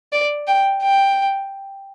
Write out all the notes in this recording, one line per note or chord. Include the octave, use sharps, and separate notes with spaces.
D5
G5
G5